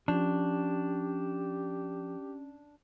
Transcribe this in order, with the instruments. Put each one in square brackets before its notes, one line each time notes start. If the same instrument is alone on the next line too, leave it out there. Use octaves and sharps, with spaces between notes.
[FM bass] F3 [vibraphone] C#4 [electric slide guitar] D4 [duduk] G4